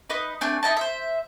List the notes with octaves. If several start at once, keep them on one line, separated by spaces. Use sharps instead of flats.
D#4 B4 D#5
A3 C4 D4 G#5
D#4 E4 D#5 A5
C5 E5